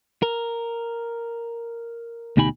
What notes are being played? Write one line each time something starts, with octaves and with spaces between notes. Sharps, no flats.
A#4
D2 B2 D#4 G4 G#5 B5